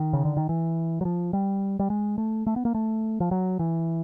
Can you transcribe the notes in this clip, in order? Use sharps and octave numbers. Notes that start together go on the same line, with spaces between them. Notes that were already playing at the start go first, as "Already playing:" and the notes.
Already playing: D#3
C#3
D3
D#3
E3
F#3
F3
G3
G3
G#3
A3
A3
B3
A#3
A3
F3
F#3
E3